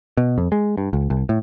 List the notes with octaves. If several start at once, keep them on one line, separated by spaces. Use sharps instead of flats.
B2
F2
G#3
G2
C#2
C2
A2